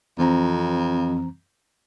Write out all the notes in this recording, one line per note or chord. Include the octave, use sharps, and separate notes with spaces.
F2 E3 C4 A#5